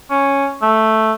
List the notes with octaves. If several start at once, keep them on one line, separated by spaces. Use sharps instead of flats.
C#4
A3